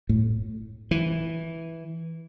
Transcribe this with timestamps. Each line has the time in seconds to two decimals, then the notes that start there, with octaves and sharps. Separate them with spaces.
0.09 A2
0.91 E3